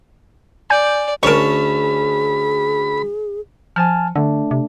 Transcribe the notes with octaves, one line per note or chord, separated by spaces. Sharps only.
D5 G#5 G6
D2 C#4 G#4 A#4 A5 B5 C#6
F3 G#5 A5 F6
D3 A3 D4
C3